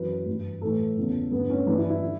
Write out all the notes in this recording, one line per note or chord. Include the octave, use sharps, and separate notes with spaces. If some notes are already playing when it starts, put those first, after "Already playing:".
Already playing: F#2 E3 B4
G2 E3
A2 E3 A4
E2 C#3 E3
G2 D3 B3
C#4
G2 E3 D4
E4
E4
D3